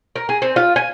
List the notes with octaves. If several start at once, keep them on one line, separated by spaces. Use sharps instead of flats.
A#4
G#4
C4
F4
G#5